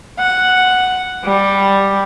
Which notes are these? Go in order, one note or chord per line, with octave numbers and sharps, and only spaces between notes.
F#5
G3